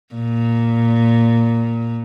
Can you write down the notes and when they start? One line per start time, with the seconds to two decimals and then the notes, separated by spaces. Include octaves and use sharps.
0.14 A#2